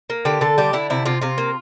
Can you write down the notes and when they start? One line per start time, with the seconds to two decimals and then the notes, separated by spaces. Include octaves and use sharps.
0.10 A#3
0.25 D3 G4
0.41 D3 A4
0.58 G3 G4
0.73 D3 E4
0.90 C3 E4
1.06 C3 F4
1.22 C3 F4
1.38 A#3